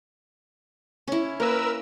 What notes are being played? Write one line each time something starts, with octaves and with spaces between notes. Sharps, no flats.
C#4 E4
A#3 A#4 B4 E6